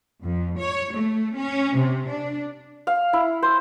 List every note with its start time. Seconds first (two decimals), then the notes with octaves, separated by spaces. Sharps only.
0.23 F2
0.58 C#5
0.93 A3
1.35 C#4
1.77 C3
2.09 D4
2.87 F5
3.13 E4
3.42 C5